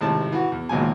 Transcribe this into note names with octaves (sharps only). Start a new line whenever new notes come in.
G#1 A2 C3 A5
E3 F#4
E2
G#1 C#2 A#2 F#3 G#5